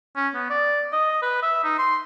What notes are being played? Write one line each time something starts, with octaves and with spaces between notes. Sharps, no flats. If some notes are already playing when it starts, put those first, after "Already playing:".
C#4
B3
D5
D#5
B4
E5
D#4
C6